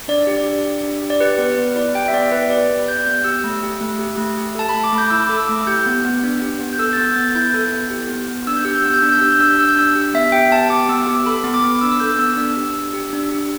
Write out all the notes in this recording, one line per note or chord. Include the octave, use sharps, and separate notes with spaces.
D4 D5
G4
D4
G4
D4
G4
D5
G4 B4
B3
B3
E4 D5
G4 G5
E5
B3 D5
B3 B4
G4 D5
B3
G4 G6
B3 G6
G4 E6
A3
G4
A3
G4
A3
G4
A4 A5
A3 B5
D6
A3
G6
E4 E6
D6
A4
E6
A3
G4 G6
B3
B3
D4
G4
B3
G6
A4 E6
A6
B3 G6
B3 A6
E4 G6
A4
B3
G4
B3
B3
D4 E6
G6
G4 E6
G6
B3 E6
G6
D4 E6
G6
G4 E6
G6
D4 E6
G6
G4 E6
G6
D4 E6
G4
B3 E5
G4 G5
B3 A5
G4 D6
B3 E6
G4 D6
A4 B5
B3
D6
B3
D4 E6
E6
A4 G6
B3 E6
D4 E6
G4
D4
G4
D4
G4